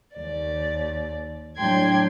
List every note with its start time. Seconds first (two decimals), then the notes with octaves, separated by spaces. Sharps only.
0.17 D#2 D5
1.58 A2 F#3 D4 G5 C6 G#6